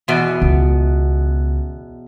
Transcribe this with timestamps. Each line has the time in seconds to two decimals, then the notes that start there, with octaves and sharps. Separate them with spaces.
0.08 E2 B2
0.42 C#2